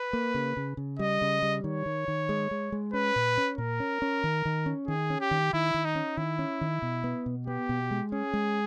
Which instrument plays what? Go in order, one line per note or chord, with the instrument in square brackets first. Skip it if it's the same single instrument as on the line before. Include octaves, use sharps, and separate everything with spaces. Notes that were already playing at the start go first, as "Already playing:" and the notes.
Already playing: [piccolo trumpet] B4
[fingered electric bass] A#3
C#3
C#3
C#3
[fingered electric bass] G3 [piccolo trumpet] D#5
[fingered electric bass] C#3
G3
[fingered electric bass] D#3 [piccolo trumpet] C#5
[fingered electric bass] D#3
D#3
G#3
G#3
G#3
[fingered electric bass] C#4 [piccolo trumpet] B4
[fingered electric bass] A#2
C#4
[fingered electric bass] A#2 [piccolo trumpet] A#4
[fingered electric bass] C#4
C#4
D#3
D#3
C#4
[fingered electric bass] D#3 [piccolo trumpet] G#4
[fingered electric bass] C#4
[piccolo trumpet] G4
[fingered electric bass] D#3
[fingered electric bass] D#3 [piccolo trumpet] E4
[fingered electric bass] D#3
[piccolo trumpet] D#4
[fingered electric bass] C#4
[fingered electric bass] D#3 [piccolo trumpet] E4
[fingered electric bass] C#4
D#3
B2
B3
B2
[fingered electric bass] B3 [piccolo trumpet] G4
[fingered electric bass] B2
G#3
[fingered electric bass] C#4 [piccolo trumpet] G#4
[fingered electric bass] G#3